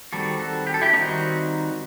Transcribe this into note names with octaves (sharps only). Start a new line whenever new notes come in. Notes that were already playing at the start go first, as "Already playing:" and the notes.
D#3 G3 C4 F#4 A4
F#4 A4
G4
A4
E4 G4
D#3 G3 C4 D#4 F#4